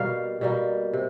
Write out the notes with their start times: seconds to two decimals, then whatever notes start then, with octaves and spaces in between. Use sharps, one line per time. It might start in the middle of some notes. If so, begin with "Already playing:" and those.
Already playing: B2 G3 A#3 F5
0.41 B2 G3 A#3
0.93 C3